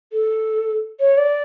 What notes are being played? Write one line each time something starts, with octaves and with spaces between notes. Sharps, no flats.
A4
C#5
D5